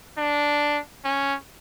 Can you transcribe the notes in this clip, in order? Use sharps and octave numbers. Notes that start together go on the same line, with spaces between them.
D4
C#4